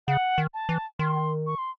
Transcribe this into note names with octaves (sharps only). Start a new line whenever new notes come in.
C#3 F#5
D#3
A5
E3
D#3 C6
C#6
C6